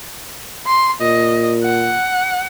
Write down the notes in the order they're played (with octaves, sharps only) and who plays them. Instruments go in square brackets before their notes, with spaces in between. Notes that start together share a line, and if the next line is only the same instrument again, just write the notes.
[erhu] C6
[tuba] A#2 [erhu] D#5
[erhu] F#5